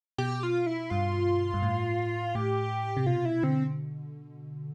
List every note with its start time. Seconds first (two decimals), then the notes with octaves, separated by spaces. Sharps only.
0.18 B2 G4
0.43 F4
0.66 E4
0.90 G2 F4
1.54 G2
1.62 A2
2.35 A2 G4
2.97 C3
3.06 B2 F4
3.25 E4
3.43 D3 C4